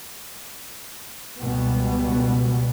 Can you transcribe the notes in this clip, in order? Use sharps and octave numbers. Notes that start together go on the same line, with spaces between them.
C#2 B2 G3 B3